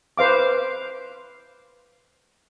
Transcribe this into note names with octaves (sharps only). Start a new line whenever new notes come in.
B4 C5 F5 D6